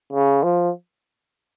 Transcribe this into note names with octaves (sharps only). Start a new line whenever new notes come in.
C#3
F3